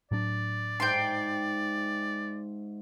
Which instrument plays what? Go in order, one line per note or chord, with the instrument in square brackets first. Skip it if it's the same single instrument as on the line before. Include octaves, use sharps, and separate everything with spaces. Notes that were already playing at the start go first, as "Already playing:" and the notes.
[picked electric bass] A2 F#3 D4 [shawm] D5
[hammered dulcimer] G#2 G#3 E5 [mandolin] G5 C6